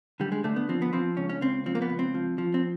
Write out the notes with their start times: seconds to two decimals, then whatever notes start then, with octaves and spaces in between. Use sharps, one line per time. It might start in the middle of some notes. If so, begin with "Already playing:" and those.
0.20 D3 G3
0.32 G#3
0.44 D3 A3
0.56 B3
0.69 F3 C4
0.82 B3
0.93 F3 C4
1.17 C#2 C#4
1.30 C#4
1.41 C#2 C4
1.66 F3 C4
1.75 A#3
1.82 B3
1.90 C#2
1.99 C4
2.14 F3
2.38 F3
2.54 C4